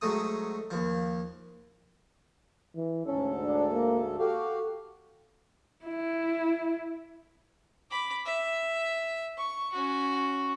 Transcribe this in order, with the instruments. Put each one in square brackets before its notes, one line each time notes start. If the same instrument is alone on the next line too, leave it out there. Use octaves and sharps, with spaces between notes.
[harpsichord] G#2 F#3 A3 D#6
D#2 F3
[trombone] E3
[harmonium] D2 G#2 A4 [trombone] C#4
[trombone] D4
A#3
[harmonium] F#4 G4 F5 [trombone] A4
[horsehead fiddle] E4
[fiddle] B5 D6
E5
C#6
C#4 F#4